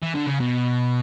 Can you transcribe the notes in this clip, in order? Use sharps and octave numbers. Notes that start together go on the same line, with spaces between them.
E3
D3
C#3
B2